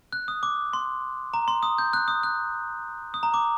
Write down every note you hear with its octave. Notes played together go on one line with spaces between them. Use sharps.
F#6
D#6
D6
C6
A#5
C6
D#6
G6
F#6
D#6
F#6
D#6
A#5
D6